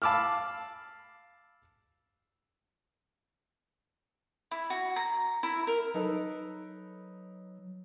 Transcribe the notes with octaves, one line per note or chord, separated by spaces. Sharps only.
F5 A5 B5 D6 E6 F6
E4
F#4
A#5
E4
A#4
F#3 D#4 A4 B4